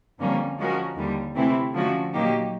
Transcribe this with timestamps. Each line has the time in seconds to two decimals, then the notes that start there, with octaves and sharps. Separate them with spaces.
0.19 F2 D3 G3 A#3 C#4
0.58 F3 G#3 C#4 F#4 A#4
0.96 D#2 D3 G3
1.35 C3 E3 A3 C4 E4
1.74 D3 F3 A3 C#4 F#4
2.13 A#2 F#3 A#3 D#4 G4